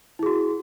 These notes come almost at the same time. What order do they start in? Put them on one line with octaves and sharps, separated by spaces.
E4 G#4 F#4